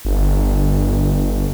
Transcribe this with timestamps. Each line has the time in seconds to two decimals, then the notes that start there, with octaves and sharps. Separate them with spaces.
0.05 G1